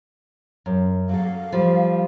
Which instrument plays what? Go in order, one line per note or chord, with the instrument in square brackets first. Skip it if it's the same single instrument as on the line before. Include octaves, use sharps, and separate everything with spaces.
[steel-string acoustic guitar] F#2
[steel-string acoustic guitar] F#3 A4 [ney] F5
[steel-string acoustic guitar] F3 G3